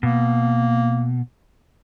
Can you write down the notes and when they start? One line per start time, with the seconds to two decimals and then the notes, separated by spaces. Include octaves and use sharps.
0.03 B2 A#3